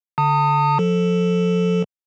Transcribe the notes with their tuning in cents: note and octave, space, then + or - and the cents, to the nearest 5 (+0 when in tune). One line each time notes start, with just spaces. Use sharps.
D3 -20 A5 +40 D#6 +0
F3 +25 A4 +0